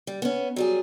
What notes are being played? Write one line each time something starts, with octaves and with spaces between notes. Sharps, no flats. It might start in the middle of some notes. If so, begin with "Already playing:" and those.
G3
B3 C#4
F#3 G3 G#4